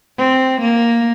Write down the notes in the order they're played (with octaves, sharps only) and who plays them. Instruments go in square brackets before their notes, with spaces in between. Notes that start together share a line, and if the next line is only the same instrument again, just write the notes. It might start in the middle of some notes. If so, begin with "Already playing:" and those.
[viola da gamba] C4
A#3